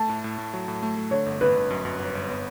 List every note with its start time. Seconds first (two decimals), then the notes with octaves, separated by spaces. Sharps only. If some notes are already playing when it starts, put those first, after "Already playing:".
Already playing: A3 A5
0.09 A2
0.24 A2
0.38 A2
0.54 F#3
0.68 A2
0.83 A3
0.97 A3
1.11 D3 C#5
1.26 G1
1.41 G1 B4
1.55 G1
1.70 F#2
1.85 F#2
2.00 G1
2.15 G1
2.29 B3